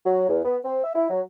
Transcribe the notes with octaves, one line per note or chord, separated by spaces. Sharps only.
F#3
E2
B3
C4
E5
E4
F#3